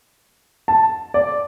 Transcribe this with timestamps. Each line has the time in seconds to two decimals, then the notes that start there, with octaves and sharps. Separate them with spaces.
0.68 A5
1.14 D5